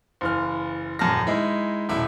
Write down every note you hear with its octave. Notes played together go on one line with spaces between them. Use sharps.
F#1 E3 F6
D#1 F#2 A5 F6 A#6
G#3 D#4 E4
D#1 B1 E4